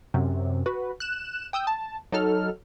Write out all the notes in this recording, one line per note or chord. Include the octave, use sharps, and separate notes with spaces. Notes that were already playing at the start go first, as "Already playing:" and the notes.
F#2 C3
F#4 B4
F#6 E7
G5 D#6 E6 G6
A5
F#3 D#4 A4 F6